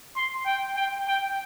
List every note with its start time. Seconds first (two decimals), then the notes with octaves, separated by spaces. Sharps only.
0.16 C6
0.46 G5
0.76 G5
1.08 G5